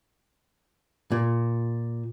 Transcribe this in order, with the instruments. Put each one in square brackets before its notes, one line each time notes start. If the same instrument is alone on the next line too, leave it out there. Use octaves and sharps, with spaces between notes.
[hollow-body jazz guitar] A#2